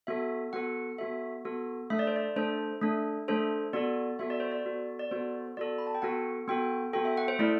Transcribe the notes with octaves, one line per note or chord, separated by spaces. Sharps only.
B3 F#4 A4 E5
B3 F#4 A4 F#5
B3 F#4 A4 E5
B3 F#4 A4
A3 D4 A4 E5
D5
C5
D5
A3 D4 A4 C5
A3 D4 A4
A3 D4 A4 C5
B3 F#4 A4 D5
B3 F#4 A4 E5
D5
C5
D5
B3 F#4 A4
D5
B3 F#4 A4 C5
B3 F#4 A4 D5
B5
A5
G5
B3 F#4 A4 F#5
B3 F#4 A4 G5
B3 F#4 A4 G5
E5
F#5
C5
A3 E4 A4 D5